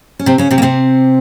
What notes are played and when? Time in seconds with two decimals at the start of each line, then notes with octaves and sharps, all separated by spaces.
0.19 C#4
0.26 C3 C4
0.38 C#3 C#4
0.51 C3 C4
0.58 A#3
0.62 C3 C4